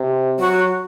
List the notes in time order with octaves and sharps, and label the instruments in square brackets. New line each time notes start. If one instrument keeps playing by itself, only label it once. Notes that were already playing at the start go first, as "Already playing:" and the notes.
Already playing: [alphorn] C3
[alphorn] F#3 [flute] F#4